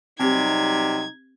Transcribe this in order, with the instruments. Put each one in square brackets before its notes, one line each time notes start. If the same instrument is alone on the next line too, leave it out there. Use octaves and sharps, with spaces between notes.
[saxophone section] C3 F#3 G3 [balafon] C4 G4 [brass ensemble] D#4 [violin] G#6